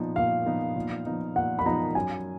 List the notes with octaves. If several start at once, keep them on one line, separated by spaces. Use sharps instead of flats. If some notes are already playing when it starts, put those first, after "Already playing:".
Already playing: A#2 F3 B3 D#4
A#2 F5
F3 B3 D#4
A#2
F3 B3 D#4
A#2 F#5
B5
F3 B3 D#4 A#5
F#2 G#5